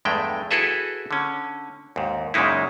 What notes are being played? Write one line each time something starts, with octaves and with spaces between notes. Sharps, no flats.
E2 G2 G#3 A3 G5
E4 F#4 G#4 A4 B4 E5
D3 C#4
D#2 G#2
F#2 A#2 C#3 G#3 D#4 E4